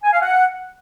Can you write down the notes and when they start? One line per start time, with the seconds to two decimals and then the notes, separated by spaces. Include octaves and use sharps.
0.04 G#5
0.13 F5
0.22 F#5